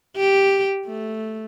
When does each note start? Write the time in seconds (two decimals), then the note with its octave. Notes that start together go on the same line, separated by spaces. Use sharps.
0.17 G4
0.86 A3